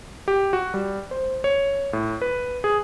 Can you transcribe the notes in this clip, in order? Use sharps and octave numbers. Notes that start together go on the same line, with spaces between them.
G4
F#4
G3
C5
C#5
A2
B4
G#4